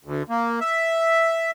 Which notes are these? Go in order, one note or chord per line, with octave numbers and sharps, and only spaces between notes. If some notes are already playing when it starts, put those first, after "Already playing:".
D2
A#3
E5